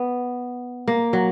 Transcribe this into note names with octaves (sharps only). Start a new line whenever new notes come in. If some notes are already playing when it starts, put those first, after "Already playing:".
Already playing: B3
A#3
F#3